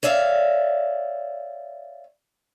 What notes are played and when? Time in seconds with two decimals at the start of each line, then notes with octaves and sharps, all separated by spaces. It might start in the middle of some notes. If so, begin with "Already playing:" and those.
0.03 C#5 D5 E5 F5